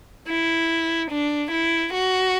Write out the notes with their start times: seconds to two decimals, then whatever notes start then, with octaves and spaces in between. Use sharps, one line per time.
0.28 E4
1.10 D4
1.51 E4
1.93 F#4